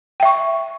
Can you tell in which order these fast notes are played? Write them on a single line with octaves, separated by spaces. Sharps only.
G5 E5 C#6